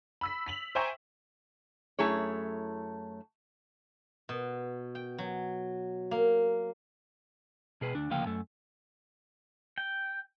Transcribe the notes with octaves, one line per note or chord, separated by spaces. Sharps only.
B5 E6 B6
B6 F7 F#7
C5 E5 G5 G#5 A#5 C#6
F#2 A3 E4 G#4 C#5
B2
G5
F#3
A#3
B2 G#4 B4
D2 D4
D2 C#3 F3 A#3 F5 G5
F#2 A3
G5